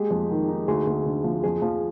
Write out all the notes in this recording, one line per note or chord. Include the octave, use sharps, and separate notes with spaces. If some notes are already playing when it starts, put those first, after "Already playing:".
Already playing: G#3 G4 G#4
F2
D#3
D#4
D2 G#4
D2
D3
F3
F2 G#4
F3